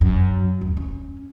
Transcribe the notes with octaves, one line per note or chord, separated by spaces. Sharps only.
F#2
D#2
C#4